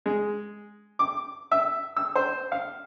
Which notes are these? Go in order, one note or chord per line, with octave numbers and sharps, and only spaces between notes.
G#3
D6
E5
E6
C5
F5